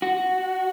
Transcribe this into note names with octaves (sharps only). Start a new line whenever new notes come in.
F#4